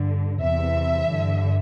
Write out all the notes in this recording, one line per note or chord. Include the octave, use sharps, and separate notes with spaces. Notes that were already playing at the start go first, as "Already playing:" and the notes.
Already playing: G2 D3
E2 C3 E3 E5
G2 D3